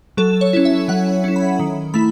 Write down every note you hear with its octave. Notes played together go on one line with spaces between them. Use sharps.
F#3 A4
C#5
C#4 E4
E5
F#3 F#5
C#4 E4
B5
D#3
A3 E4 B5